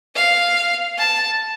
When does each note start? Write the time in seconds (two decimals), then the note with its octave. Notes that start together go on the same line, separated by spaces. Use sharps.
0.16 F5
0.98 A5